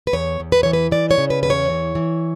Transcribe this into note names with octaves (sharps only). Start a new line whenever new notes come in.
B4
E2 C#5
E2
B4
E3 C#5
B4
E3 D5
C#5
C#3
B4
E2 B4
C#5
E3
E3